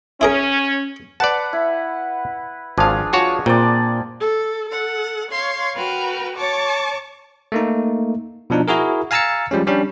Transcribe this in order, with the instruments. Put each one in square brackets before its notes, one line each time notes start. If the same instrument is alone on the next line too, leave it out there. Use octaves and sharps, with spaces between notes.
[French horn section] C#4 [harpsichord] E4 G#4 A#4
[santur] B4 F#5 [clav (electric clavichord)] D5 A5
[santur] E4
[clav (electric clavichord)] G#1 F5 [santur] F3 D4 G#4
[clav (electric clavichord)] F4 F#4 C#5
[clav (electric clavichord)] A#2 [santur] C4 D5
[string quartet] A4
A4 F#5
C#5 F5 C6
F#4 A#4 B4 G5 F6
C#5 A5 C#6 D6
[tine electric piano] A3 A#3 D#4
B2 F3 D4 D#4
E4 F#4 G#4 A#4
F5 G#5 A#5 E6 A6 C#7
F3 G3 G#3 C#4
G3 C#4 D4